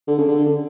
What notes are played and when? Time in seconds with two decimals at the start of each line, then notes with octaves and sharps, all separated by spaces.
0.07 D3
0.18 C#3
0.28 D3